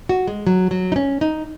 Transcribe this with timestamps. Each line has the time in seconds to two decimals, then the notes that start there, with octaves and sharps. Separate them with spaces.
0.09 F#4
0.27 G#3
0.47 F#3
0.71 F#3
0.92 D#4
0.96 C#4
1.21 D#4